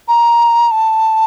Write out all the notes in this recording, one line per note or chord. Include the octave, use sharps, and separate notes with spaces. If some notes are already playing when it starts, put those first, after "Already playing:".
A#5
A5